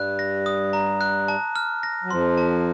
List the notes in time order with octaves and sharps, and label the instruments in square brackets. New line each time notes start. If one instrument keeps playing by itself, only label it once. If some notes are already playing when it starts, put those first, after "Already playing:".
Already playing: [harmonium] G2 G3 [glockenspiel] F#6
[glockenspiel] A#6
D#6
A#5
F#6
A5
F6
A#6
[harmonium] F#3
[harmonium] F2 F3 [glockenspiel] C6
[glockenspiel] A5